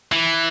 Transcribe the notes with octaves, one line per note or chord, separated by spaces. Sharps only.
E3